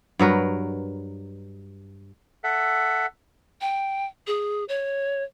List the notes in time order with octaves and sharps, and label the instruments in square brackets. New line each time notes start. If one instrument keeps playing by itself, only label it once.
[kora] G2 F#3 A#4 B4
[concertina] A4 E5 F#5
[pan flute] G5
G#4
C#5